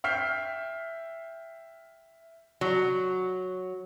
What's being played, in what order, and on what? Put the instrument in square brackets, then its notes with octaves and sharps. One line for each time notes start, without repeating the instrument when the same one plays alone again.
[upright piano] E5 G5 F6 G6 C7
[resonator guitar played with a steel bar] F#3